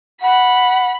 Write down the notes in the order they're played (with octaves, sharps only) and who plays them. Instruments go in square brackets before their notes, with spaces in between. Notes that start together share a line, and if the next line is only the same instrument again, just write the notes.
[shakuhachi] F#5 [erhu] B5